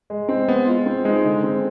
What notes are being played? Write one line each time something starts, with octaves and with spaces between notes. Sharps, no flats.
G#3
C4
G#3 B3
F4
C4
G#3 D#4
D3
C4